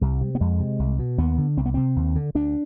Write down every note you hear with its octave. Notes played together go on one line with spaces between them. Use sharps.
C2 G3
C3
B3
F2 G#3
C3
C2
B2
D#2 B3
D3
C2 C4
B3
C3 C4
D#2
D3
D2 D4